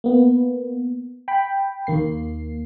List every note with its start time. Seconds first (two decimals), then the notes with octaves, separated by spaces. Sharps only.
0.04 A#3 B3
1.28 G5 B5
1.87 D#2 A#3 C7